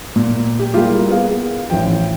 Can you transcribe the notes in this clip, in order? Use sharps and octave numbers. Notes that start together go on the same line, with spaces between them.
A#2
G4
G3 A#3 E4 F4 G4 G#4
B3 G#4 F5
A1 E3 F3 G5